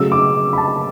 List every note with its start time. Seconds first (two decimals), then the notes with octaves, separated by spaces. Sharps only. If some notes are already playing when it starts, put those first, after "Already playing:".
Already playing: C#3 F#3 A3 E6
0.12 D6
0.53 B5
0.58 A5